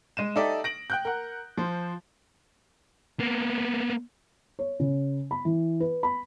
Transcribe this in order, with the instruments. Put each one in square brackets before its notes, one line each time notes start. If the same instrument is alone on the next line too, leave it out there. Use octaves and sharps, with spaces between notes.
[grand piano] G#3 D#7 E7
D#4 G4 A4 D5 E5
A#6 D7 F#7
G5 F#6 G6
A#4 F#5
F3 C5
[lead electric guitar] A#3 B3
[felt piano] C#5
C#3
B5
E3
B4
B5